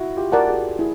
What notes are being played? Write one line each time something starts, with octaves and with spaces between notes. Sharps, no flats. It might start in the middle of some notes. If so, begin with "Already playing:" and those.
Already playing: E4 F#4
F4 G4
A#4 D5 F#5 A5
F#4 G#4
E4 G#4